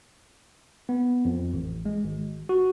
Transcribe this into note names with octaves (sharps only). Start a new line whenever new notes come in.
B3
F2
A1
G#3
G#1
F#4